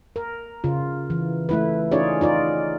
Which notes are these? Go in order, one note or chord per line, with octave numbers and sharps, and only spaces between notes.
A#4
C#3 F4
E3
A3 E4 B4
C#4 D#4 F4 G#4 C#5 D5
D#4 F4 D5